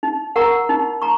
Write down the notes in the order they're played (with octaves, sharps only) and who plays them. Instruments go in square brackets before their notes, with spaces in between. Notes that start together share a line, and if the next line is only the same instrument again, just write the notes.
[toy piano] D#4
A#4 F#5 A#5 C#6
D#4
A#5 C#6